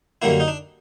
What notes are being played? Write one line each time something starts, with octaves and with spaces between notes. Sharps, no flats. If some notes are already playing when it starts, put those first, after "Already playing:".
F#2 D3 G3 A#3 E4
D#4
D4